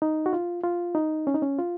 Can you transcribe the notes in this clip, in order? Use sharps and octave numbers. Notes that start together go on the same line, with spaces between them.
D#4
F#4
F4
F4
D#4
C#4
D#4
C#4
F4